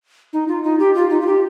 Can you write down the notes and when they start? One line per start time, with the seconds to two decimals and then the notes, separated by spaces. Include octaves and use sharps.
0.33 D#4
0.48 F4
0.64 D#4
0.79 G4
0.95 F4
1.10 D#4
1.21 F4
1.27 G4